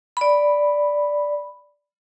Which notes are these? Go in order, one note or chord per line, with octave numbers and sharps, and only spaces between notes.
D5 B5